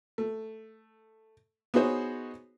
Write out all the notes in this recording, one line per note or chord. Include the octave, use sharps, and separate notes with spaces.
A3
B3 D#4 F#4 G#4 C5 C#5